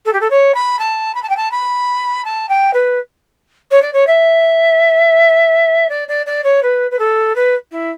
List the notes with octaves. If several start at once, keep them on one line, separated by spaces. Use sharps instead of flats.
A4
G4
A4
C#5
B5
A5
B5
A5
G5
A5
B5
A5
G5
B4
C#5
D5
C#5
E5
D5
D5
D5
C#5
B4
B4
A4
B4
E4